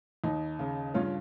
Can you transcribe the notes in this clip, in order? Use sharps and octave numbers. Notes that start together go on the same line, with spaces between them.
D#2 D#4
C#3
G2 C#4 F4